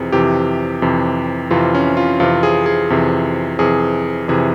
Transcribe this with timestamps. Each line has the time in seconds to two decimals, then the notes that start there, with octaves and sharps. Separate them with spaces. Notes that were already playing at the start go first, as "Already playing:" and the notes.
Already playing: F2 C3 E3 G#4
0.12 F2 C3 E3 G4
0.82 F2 C3 E3
1.51 F2 C3 E3 F4
1.75 C#4
1.97 F4
2.20 F2 C3 E3 F4
2.43 G#4
2.66 G#4
2.90 F2 C3 E3
3.59 F2 C3 E3 G#4
4.28 F2 C3 E3 G#4